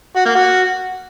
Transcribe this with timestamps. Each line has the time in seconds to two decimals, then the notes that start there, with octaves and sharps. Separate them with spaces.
0.16 F#4
0.26 A#3
0.35 F#4